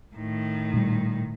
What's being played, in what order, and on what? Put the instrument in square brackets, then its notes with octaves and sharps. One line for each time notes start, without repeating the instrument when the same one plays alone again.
[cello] A2 D#3
[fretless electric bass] A#2 G3